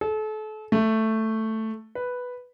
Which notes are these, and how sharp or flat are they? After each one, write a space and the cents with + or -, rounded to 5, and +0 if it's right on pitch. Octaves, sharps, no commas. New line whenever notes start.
A4 -35
A3 +5
B4 +0